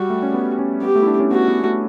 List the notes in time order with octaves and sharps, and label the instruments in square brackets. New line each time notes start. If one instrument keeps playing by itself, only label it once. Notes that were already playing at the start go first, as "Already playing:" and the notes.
Already playing: [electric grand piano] G3 [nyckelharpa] F#4
[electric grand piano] A3
C#4
B3
C#4
[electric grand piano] B3 [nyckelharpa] G4
[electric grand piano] A3
E4
D4
C#4
[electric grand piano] B3 [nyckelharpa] F#4
[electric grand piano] B3
B3
A3